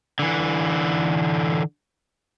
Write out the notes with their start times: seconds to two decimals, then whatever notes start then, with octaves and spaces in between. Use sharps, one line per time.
0.19 D3 E3